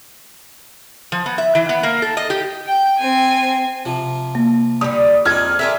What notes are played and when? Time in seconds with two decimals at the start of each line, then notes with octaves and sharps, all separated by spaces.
1.12 F3
1.26 B3
1.38 E5
1.55 E3
1.69 B3
1.83 A#3
2.02 A4
2.17 D#5
2.30 G4
2.67 G5 G6
2.98 C4 G#5
3.85 C3 F3
4.35 A#3
4.81 D3 G3 D#6
5.25 F2 C4 D#4 D5 F6 G#6
5.59 G3 F4 G#4 A#4 E5